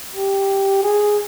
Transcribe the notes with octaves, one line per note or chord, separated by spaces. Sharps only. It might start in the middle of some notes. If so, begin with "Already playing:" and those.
G4
G#4